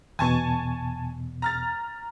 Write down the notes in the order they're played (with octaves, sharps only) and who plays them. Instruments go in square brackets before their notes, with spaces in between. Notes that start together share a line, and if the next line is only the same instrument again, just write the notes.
[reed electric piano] E2 B2 [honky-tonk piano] G#5 A5 C#6
[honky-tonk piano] A#5 F6 A6